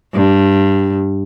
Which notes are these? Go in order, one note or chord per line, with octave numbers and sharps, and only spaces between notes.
G2